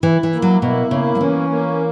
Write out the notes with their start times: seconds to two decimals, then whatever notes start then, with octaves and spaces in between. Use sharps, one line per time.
0.03 E3 E4
0.23 E3
0.33 A#3
0.42 F#3
0.62 B2 E4
0.91 C#3 A#3
1.15 F#3
1.20 E3 C#4
1.49 A#3